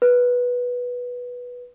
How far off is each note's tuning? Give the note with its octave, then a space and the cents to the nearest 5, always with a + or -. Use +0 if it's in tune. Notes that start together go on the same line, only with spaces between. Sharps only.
B4 -10